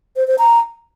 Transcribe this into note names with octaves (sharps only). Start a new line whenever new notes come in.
C5
C5
A#5